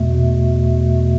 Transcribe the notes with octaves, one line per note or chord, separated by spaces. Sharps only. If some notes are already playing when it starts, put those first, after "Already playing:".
Already playing: E2 B2 A3